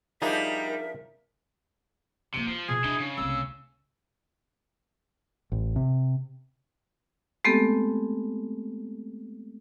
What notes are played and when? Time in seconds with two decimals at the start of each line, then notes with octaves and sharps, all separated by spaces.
0.22 F3 G3 D4 D#4 G#4 A#4 E5
2.34 C3 F3 A#3
2.47 F3 F4
2.69 B2 G#4
2.84 D4 E4 D#5
2.99 C#3
3.18 C2 A3 E6
5.52 A1
5.76 C3
7.44 G#3 A3 B3 C4 G4 A4